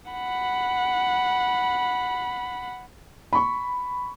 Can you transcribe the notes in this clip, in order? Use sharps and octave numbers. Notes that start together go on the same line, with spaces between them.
F#5 B5
B5 C#6